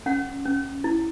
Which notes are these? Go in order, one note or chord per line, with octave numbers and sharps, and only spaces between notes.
C#4 F#5
C#4
E4